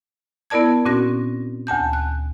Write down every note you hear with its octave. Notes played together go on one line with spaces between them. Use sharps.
B3 E4 A#4 D5 A5 G#6
A#2 C4 C#4 F#4 A#6
D2 G#5 A5 G6
F#6